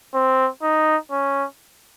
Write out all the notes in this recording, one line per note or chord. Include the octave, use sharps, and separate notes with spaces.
C4
D#4
C#4